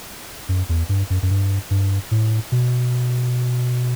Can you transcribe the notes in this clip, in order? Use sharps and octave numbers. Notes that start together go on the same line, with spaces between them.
F#2
E2
G2
F#2
F#2
G2
G2
A2
B2